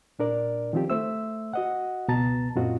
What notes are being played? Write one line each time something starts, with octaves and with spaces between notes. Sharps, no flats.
A#2 D4 A#4 D5
D#3 F3 C4 F4 G4
A3 C5 E5 E6
F#4 D#5 F#5
C#2 B2 B3 A5 A#5 A6
F#2 A#2 C4 F4 F#4 D#5